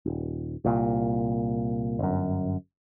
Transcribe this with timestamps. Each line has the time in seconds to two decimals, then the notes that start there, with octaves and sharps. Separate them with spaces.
0.06 D#1
0.65 C2 A#2
1.99 G1 F#2